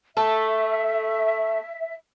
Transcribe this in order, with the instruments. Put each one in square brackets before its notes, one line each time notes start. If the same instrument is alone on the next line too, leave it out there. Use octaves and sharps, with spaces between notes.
[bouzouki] A3 A4 [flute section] E5